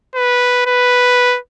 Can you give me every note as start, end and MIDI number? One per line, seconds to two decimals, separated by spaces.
0.15 0.65 71
0.67 1.38 71